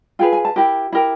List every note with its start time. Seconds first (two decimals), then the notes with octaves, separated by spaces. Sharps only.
0.19 F4 G#4 B4 G5
0.33 G#5
0.45 A5
0.56 E4 G4 A#4
0.92 E4 G4 A#4